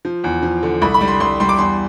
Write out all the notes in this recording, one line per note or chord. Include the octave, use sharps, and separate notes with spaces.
F3
E2
F3
D3
C2 B5
B5
G3
C6
C2 C6
G3 C6
D6
E2 C6